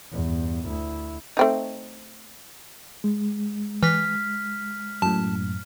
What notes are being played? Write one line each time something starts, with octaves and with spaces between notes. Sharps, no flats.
E2 G2
D2 E4
A3 C4 D#4
G#3
E3 F6 B6
F#2 A2 A5